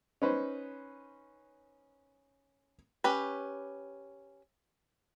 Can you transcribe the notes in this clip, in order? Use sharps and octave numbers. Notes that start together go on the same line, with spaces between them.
C#4 D#4 B4 C5
C#4 G4 B4